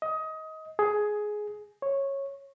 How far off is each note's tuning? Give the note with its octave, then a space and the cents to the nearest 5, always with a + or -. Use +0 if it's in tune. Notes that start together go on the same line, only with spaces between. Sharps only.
D#5 +20
G#4 +10
C#5 -10